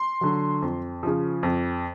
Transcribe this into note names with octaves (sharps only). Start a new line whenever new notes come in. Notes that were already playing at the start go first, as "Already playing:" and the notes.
Already playing: C6
D3 F#3
F2
C#3 F3
F2